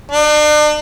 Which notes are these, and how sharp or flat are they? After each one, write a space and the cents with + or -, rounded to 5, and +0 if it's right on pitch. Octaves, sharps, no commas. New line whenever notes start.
D4 +40